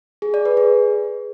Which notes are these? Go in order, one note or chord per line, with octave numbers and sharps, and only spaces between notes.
G#4
D5
B4
G#4